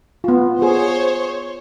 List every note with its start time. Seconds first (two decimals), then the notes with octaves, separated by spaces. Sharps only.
0.24 B3 F4
0.59 F4 G#4 C5 C#5